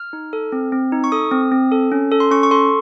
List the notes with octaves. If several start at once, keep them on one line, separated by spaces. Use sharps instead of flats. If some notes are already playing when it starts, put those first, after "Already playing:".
Already playing: F6
D#4
A4
C4
C4
D#4
C#6
A4 D#6
C4
C4
A4
C#4
A4
C6
C#4 C#6
C#6
A4 C6